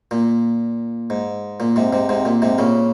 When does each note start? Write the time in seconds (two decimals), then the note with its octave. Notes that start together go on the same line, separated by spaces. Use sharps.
0.11 A#2
1.10 G#2
1.60 A#2
1.76 G#2 C3
1.93 G#2 C3
2.09 G#2 C3
2.25 A#2
2.42 G#2 C3
2.58 A#2 C#3